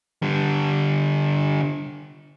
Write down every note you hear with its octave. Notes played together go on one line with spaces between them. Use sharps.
D3 G3